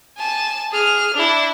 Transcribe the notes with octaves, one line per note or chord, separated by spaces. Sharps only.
G#5 A5
G#4 F6
D4 E4